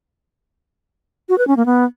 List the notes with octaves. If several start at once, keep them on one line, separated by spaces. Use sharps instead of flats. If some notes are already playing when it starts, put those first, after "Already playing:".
F#4
B4
C#4
A#3
B3